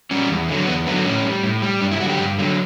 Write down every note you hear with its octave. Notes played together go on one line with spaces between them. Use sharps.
G3 C#4
E2
D3 F#3
E2 B3
D3 F#3 B3
A2 C#4
G3
A2
G3
G2 D4
E4
D3 F#3 F#4 G4
G2
D3 F#3